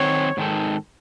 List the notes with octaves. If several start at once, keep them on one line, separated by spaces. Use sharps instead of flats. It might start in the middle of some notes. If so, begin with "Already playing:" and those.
Already playing: D#3 F#3 C4 F#4 C5 C#5
G#2 D#3 G#3 D#4 A4